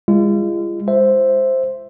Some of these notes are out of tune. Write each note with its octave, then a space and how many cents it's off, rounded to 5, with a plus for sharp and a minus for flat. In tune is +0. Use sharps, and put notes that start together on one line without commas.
G#3 -30 F4 -40
C5 +0 E5 +0